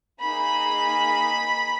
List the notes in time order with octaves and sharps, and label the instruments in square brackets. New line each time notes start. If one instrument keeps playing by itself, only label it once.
[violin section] A#3 D#4 G#4 B5